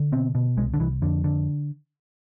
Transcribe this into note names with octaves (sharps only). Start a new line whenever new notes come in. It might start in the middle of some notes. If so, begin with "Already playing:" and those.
Already playing: D3
B2 C4
B2
C2 G#3
D3
C2 E3
F2 D3
D3